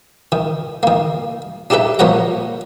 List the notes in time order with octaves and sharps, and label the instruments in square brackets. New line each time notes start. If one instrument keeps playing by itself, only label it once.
[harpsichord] D#3
D#3 A#3
D4 D#4 G4 A4 B4 E5
A#2 F3 A#4 C#5 F#5 A#5